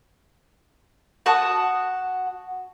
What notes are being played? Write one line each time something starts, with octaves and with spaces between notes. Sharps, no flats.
F#4 F#5 A5 D#6